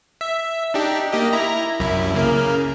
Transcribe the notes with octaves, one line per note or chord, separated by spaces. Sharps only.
E5
D4 D#4 G4
A#3 G4 D#5
E4 A#5
C2 F#2 E4
C#3 A#3 A#4